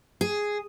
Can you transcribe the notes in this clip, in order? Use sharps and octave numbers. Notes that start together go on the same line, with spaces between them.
G#4